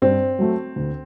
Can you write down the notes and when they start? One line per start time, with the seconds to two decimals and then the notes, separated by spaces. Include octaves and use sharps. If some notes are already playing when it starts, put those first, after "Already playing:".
0.02 G2 C4
0.39 F#3 A3
0.76 D2